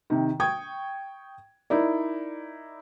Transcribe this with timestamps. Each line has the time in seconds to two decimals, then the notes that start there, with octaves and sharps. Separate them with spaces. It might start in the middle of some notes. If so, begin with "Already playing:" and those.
0.10 C3 D#3
0.40 G5 C#6 D#6 G#6
1.70 D#4 E4 A#4 D5